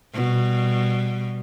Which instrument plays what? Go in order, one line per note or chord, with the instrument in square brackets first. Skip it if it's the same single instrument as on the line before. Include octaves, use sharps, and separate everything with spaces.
[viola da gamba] B2 G3